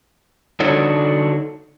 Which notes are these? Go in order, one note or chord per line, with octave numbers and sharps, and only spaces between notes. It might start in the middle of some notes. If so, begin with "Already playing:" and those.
D3 D4 D#4 F#4 A4 C#5